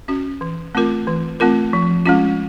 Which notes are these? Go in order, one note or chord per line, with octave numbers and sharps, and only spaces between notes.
C#4 F#4
E3
A3 C4 F4 A#4
E3
A3 C4 F4 A#4
F3
G#3 C#4 F4